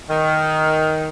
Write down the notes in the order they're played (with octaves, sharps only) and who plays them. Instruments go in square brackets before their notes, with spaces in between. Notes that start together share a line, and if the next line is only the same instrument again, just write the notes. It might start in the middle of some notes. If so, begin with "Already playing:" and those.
[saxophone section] D#3